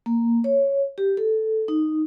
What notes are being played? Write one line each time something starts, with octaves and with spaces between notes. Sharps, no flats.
A#3
C#5
G4
A4
D#4